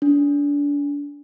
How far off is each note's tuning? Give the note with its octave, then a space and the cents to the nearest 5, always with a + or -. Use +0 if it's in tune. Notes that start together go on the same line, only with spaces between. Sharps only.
D4 -30